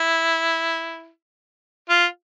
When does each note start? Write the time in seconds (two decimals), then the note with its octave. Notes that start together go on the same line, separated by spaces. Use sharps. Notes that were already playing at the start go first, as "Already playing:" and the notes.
Already playing: E4
1.90 F4